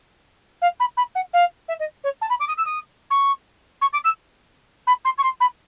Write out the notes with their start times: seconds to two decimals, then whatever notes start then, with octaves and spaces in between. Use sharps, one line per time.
0.62 F5
0.80 B5
0.97 B5
1.15 F#5
1.33 F5
1.68 E5
1.80 D#5
2.04 C#5
2.21 A5
2.30 B5
2.40 D6
2.48 D#6
2.58 E6
2.66 D#6
3.10 C#6
3.81 C#6
3.93 D6
4.04 E6
4.87 B5
5.05 C6
5.18 C#6
5.23 C6
5.40 B5